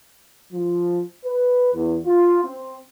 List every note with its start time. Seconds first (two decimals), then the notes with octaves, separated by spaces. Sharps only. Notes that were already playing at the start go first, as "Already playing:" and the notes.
0.53 F3
1.25 B4
1.74 E2
2.06 F4
2.44 C4